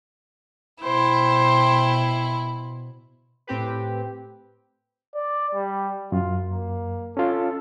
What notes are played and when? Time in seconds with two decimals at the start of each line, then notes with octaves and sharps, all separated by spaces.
0.82 B2 E4 C5 G5
3.47 A2 C4 G4 B4
5.15 D5
5.54 G3
6.12 F#2 F4
6.50 A#3
7.17 C#4 F4 A4